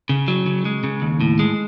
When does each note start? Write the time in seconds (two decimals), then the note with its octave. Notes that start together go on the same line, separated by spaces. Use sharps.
0.09 C#3
0.28 F#3
0.46 C#3
0.65 G#3
0.84 C#3
1.02 D#2
1.21 A2
1.39 G#3